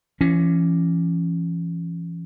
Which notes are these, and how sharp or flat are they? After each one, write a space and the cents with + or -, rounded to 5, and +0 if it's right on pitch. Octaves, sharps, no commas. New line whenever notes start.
E3 +40 C#4 +0